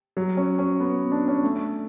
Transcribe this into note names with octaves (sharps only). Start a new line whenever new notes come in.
F#3
C#4
C#4
B3
D4
C#4
A3